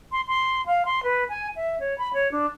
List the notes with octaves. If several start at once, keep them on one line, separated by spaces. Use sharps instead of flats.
C6
C6
F5
C6
B4
G#5
E5
C#5
B5
C#5
D4